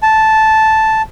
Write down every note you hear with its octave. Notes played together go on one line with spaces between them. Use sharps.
A5